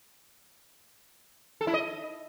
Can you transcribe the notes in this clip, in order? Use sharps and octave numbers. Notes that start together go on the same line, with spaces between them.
A4
E4
D#5